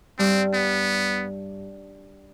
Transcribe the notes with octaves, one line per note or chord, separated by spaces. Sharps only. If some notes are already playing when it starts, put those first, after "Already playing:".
G2 G3 C4
B3